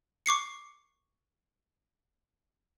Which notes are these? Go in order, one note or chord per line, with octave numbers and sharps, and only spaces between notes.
C#6 D6 C7 C#7